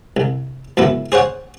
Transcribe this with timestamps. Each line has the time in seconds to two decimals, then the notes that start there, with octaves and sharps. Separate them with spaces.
0.17 C2
0.77 C#2 F#2 B3 E4
1.12 G#4 C5 C#5 F#5